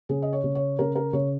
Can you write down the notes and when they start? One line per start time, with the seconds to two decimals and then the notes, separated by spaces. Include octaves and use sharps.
0.09 C#3 G#4
0.22 D#5
0.33 C#5
0.44 C#3
0.55 C#5
0.79 C#3 A#4
0.95 A#4
1.13 C#3 C#5